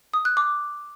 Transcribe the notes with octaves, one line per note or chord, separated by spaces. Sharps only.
D#6
F#6
D6